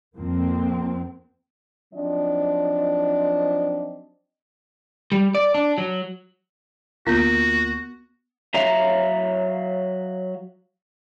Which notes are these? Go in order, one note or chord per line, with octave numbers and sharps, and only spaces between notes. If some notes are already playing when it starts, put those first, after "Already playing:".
F2 A#3 C4
F3 F#3 C4 D4 D#4 D#5
G3
D5
D4
F#3
D2 A#3 B3 F4 F#4 G6
F#3 C#5 E5 F5 A#5